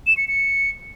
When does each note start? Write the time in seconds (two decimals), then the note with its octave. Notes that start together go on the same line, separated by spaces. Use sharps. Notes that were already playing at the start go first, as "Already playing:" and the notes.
0.07 E7
0.17 C#7
0.28 C#7